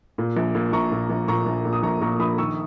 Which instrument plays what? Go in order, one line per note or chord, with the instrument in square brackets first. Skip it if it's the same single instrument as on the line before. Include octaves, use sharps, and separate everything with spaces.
[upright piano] A#2
A#1
A#2
A#1 A#5 C#6
A#2
A#1
A#2 A#5 C#6
A#1
A#2
D#6
A#1 A#5 C#6
A#2 A#5 C#6
A#1 B5 D#6
D#3 C#6 E6